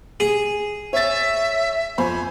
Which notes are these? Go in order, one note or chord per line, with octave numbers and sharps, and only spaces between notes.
G#4
C#5 E5 A6
F2 C5 G#5 B5